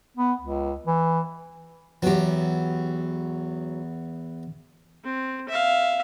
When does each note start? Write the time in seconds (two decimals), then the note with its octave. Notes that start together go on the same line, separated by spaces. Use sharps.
0.17 B3
0.41 C#2
0.87 E3
2.02 E2 F#3 B3 G4
5.05 C4
5.49 E5 F5